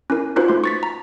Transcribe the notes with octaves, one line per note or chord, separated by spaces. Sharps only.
C#4 E4 A#4
C#4 D#4 F4 F#4 B4 C5
A3 C6
C#6 A6 B6
A#5